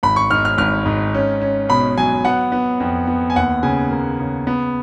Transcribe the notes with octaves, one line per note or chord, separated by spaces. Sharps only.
G#1 B5
C#6
G#2 F6
F6
G#1 F6
G#2
C#4
C#4
B2 B5
F#3 G#5
B3 F#5
B3
F2
B3
G#5
D#2 F#5
C#3 G#5
A#3
C#3
B3